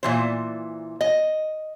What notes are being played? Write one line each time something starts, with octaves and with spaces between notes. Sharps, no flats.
A#2 E3 C5
D#5